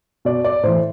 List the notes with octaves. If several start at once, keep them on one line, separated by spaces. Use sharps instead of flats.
B2 D5
D5
A2 E3 C5